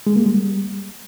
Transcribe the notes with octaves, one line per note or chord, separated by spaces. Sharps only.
G#3
A#3
G3